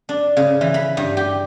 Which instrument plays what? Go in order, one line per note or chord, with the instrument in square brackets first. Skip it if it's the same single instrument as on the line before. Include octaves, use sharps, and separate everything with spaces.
[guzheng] D4
C#3
E3
B5
G2
G4